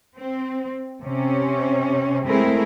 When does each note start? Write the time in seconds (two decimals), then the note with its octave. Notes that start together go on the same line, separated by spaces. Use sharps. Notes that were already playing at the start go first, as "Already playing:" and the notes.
0.17 C4
1.02 C3 C#4
2.25 G#3 A3 C4 E4 G#4 A#4